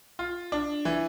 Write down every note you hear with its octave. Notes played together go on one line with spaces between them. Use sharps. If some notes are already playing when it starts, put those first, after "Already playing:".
F4
D4
E3